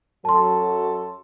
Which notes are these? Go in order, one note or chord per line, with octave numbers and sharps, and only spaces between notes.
F#2 F#3 A4 A5 C6